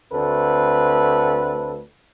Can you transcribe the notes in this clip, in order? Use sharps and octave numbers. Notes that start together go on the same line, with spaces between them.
D2 A3 C4 A4 B4